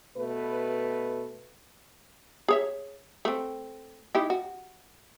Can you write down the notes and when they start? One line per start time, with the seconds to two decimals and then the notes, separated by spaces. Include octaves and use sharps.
0.17 B2 A3 B4
2.48 G#4 C#5 E5
3.25 A3 C4
4.15 D#4 E4 G4
4.30 F#4